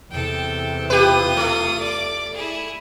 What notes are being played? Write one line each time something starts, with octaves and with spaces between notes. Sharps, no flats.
E2 C3 A4 G5
F4 G4 B4 D#6
A3
D5 D6
E4 G#4